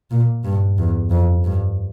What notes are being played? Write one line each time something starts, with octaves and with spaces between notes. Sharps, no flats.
A#2
G2
E2
F2
G2